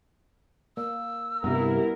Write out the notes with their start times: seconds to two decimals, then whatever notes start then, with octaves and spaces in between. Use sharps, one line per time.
0.77 A#3 E6
1.44 G2 C3 G3 B3 E4 A#4